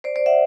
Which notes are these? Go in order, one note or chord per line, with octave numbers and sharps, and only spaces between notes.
C5 D5
C5 D5
E5 F#5